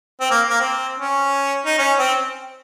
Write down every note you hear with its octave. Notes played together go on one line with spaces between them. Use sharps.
C4
A#3
A#3
C4
C#4
D#4
C#4
C4